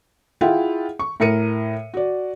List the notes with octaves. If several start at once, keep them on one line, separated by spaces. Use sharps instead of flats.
E4 F4 G#4 E5 F#5 G5
C#6
A2 A#4 C#7 D#7
F#4 D5